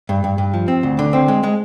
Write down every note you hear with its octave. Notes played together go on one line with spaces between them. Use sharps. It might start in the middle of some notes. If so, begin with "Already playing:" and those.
G2
G2
G2
F3
C4
D2
D3
C4
G#3
G#3